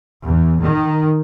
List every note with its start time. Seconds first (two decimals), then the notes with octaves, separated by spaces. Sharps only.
0.25 E2
0.61 D#3